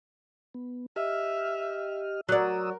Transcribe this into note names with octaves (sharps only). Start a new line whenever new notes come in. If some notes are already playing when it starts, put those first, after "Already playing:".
B3
G4 D#5 E5 F6
F#3 A#4 D5 D#6 E6